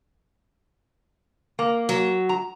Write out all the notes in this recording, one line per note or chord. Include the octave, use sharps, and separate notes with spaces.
A#3
F#3
A#5